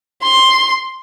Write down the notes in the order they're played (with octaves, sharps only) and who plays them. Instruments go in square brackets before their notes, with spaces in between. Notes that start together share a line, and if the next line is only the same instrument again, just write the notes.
[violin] C6